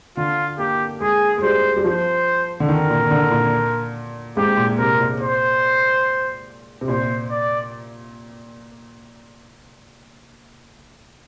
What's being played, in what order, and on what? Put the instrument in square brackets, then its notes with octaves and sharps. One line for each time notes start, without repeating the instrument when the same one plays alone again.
[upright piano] D3 [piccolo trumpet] F4
[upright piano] A#3 [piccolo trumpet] G4
[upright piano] G#3 [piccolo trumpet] G#4
[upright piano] G#3
[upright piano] G3 [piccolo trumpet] C5
[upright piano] G3
[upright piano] F3 [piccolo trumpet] C5
[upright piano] D3
[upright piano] D#3 [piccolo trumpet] A#4
[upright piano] A#2
D3
A#2
[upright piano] G#2 [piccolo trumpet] G4
[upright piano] A#2
[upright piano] C3 [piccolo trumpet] A#4
[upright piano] A#2
[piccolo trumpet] C5
[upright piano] C3
[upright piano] A#2 [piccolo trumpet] C5
[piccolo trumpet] D5